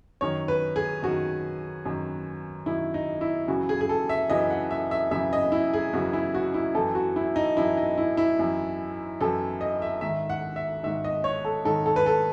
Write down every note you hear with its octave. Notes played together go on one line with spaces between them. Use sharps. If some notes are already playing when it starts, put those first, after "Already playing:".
F#2 D#3 C#5
B4
G#4
F#2 D#3 F#4
F#2 D#3
F#2 D#3 E4
D#4
E4
F#2 C#3 E3 F#4
G#4
G#4
A4
E5
F#2 C#3 E3 D#5
F#5
E5
E5
F#2 C#3 E3 E5
D#5
E4
G#4
F#2 C#3 E3 F#4
E4
F#4
E4
F#2 E3 A4
F#4
E4
D#4
F#2 E3 E4
D#4
E4
E4
F#2 E3
F#2 E3 A4
D#5
E5
G#2 D#3 E5
F#5
E5
G#2 D#3 E5
D#5
C#5
A4
G#2 D#3 A4
A4
B4
A4